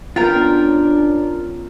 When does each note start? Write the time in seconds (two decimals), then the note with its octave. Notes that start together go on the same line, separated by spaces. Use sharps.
0.16 B3 C#4 D4 F4 A#4 G5